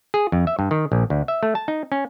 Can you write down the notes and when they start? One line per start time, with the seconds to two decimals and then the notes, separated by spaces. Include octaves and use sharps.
0.14 G#4
0.32 F2
0.47 E5
0.59 G2
0.71 D#3
0.92 A#1
1.10 D2
1.28 E5
1.43 A3
1.55 A5
1.68 D#4
1.92 C#4